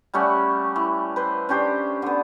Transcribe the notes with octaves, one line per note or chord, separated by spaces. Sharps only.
G3 A3 C#4 F#5
E3
B4 C5
C#4 D4 G4 C5
D3 B3